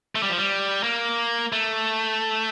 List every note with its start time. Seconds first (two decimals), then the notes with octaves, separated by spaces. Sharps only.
0.15 A3
0.23 G3
0.29 F3
0.38 G3
0.83 A#3
1.52 A3